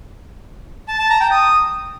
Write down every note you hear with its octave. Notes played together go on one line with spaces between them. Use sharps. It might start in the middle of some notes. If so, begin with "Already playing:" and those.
A5
A5
A#5
G5
D#6